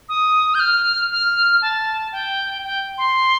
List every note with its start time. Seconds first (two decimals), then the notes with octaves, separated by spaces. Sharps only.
0.09 D#6
0.55 G6
0.60 F6
1.11 F6
1.62 A5
2.12 G5
2.64 G5
2.98 C6